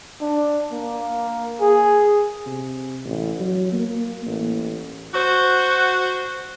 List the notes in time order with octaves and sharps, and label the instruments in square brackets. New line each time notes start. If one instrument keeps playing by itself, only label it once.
[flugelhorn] D4
A#3
G#4
[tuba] C3
A1
F#3
A#3
A1
[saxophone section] F#4 C5